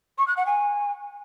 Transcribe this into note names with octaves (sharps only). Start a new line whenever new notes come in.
C#6
F#6
F#5
G#5